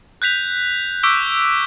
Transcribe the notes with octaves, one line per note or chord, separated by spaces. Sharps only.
F#6 G6 B6 F7
C#6 D6 E6 G6 B6 D7